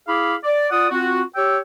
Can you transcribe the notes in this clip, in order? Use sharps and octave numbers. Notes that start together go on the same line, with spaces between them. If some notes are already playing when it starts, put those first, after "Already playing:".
E4 G#4 F5 B5 D6
D5
F4 D5 F#5 D#6
C4 F4 F#4
G4 C#5 G5 E6